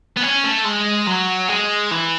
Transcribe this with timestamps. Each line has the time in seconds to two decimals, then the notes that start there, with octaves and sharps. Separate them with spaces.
0.17 B3
0.23 C#4
0.44 A3
0.65 G#3
1.07 F#3
1.49 G#3
1.91 E3